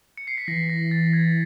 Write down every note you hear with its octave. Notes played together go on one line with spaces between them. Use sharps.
C#7
C7
B6
E3 A#6
A#6
A6
G#6